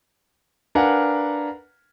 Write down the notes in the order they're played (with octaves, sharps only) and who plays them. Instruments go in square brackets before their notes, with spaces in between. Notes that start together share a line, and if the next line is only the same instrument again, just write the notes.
[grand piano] D4 A#4 B4 F5 F#5 G#5